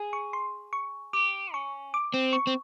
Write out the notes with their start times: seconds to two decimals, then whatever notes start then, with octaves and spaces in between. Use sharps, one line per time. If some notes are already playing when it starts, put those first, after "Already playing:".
Already playing: G#4
0.13 C#6
0.33 C6
0.73 C#6
1.13 G4 D6
1.54 C#4 C#6
1.94 D6
2.14 C4
2.33 C#6
2.47 C4